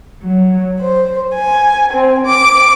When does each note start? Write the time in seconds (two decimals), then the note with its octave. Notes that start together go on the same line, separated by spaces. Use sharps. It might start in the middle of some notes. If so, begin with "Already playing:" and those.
0.24 F#3
0.80 C5
1.36 G#5
1.93 C4
2.25 D6